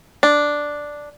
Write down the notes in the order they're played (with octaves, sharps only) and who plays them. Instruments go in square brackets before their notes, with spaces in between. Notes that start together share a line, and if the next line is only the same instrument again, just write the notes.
[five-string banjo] D4